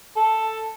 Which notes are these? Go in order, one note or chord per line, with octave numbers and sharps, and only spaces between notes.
A4